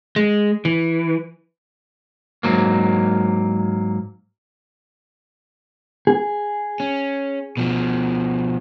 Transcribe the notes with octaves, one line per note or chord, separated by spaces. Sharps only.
G#3
E3
G#2 F#3 A#3
G#4
C#4
B2 F3